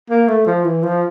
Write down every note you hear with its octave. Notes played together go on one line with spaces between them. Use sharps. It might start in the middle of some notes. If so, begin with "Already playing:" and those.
A#3
A3
F3
E3
F3